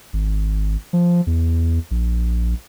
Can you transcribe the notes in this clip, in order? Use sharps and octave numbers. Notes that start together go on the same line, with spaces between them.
G#1
F3
E2
A#1